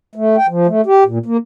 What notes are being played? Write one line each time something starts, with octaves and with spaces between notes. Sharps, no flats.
A3
G5
F3
A3
G4
A#2
A#3